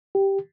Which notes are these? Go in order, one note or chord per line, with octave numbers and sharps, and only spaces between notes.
G4